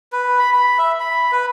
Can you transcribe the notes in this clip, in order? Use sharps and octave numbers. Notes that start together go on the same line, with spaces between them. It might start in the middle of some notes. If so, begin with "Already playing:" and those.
B4
B5
B5
E5
B5
B4